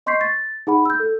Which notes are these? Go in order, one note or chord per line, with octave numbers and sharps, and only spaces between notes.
D#5 C6 C#6 G6 B6 C7
A6
D#4 G#4 F#5 B5
E6 G6
A4